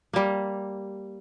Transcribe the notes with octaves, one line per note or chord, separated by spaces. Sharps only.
G3 A#3